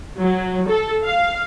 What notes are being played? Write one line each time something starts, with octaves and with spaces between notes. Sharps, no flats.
F#3
A4
F5